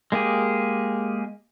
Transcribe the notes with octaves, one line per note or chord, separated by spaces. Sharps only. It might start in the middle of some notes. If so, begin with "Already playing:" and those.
G#3 A#3 G4 G#4